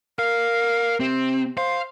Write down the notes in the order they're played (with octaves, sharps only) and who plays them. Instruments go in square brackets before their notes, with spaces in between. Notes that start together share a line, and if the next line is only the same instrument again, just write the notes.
[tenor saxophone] A#4 [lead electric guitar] F5
[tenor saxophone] C3 [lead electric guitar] C4
[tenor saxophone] C5 [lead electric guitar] F5